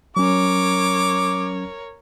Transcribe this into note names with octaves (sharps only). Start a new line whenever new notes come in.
F#3 C#4 A#4 C#5 D6